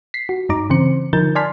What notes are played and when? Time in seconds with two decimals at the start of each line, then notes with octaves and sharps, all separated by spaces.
0.14 B6 C7
0.29 F#4
0.49 G2 D#4 A#5 D6
0.70 C#3 E3 C4 C5 C#7
1.13 D3 F3 D#4 A#4 G6 A6
1.35 D5 G#5 A5 C6 F6 B6